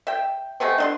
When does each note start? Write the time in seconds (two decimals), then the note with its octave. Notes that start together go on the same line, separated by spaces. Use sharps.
0.07 E5 G5
0.60 G#3 A3 B3 C4
0.78 D4 D#5 C6